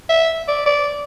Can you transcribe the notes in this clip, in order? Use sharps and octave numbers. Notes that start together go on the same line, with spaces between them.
E5
D5
D5